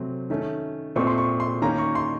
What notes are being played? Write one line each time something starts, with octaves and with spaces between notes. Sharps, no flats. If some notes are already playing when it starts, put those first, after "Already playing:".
Already playing: C3 F#3 A3 C4
D#3 A3 C#4
A#2 A3 C4 C#6
C6
C#6
C6
D#3 A#3 C#4 A#5
C#6
C6